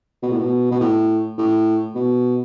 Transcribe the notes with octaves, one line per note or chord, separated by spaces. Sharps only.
B2
A2
B2
B2
A2
A2
B2